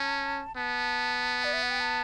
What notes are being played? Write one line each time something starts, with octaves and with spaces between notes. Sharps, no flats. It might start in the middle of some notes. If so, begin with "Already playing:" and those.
Already playing: C#4 A5
B3 A5
D5
E5
F#5
G5
A5